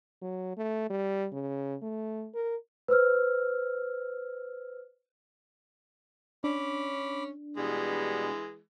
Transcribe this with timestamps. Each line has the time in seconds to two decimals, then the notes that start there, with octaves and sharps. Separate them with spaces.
0.22 F#3
0.57 A3
0.90 G3
1.32 C#3
1.82 A3
2.34 A#4
2.88 B4 C5 E6 F6
6.44 C#4 D4 B5 D6
7.57 B2 E3 G3 G#3 B3